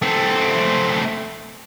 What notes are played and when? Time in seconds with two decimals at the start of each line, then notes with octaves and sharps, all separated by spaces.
0.02 A3 C4